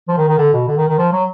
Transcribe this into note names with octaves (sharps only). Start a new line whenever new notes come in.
F3
D#3
D#3
D3
B2
D3
D#3
D#3
F3
F#3